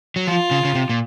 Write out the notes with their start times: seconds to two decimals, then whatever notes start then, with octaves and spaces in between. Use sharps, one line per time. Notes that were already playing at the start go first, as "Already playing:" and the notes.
0.16 F#3
0.27 F3 F4
0.51 C#3
0.65 C#3
0.75 C3
0.89 A#2